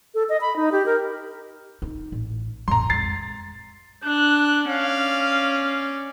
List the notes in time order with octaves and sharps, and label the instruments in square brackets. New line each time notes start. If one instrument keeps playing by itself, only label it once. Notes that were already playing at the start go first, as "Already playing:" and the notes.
[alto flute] A4
D#5
B5
D#4
G4
A#4
[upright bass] D#4
A1
[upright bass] A1 F2 [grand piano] A#5 C6
[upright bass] F2 G#3 [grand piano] A6 C7
[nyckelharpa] D4 [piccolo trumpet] F#6
[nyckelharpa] C#4 D5 [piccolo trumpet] F5